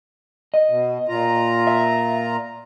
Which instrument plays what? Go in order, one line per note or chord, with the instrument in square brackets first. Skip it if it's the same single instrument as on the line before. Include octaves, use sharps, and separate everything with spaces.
[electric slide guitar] D#5
[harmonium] B2
A#2 F4 A#5
[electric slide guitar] E5